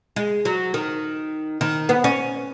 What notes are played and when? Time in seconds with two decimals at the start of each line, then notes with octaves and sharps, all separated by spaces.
0.16 G#3
0.45 F#3
0.74 D#3
1.61 D#3
1.89 B3
2.04 C#4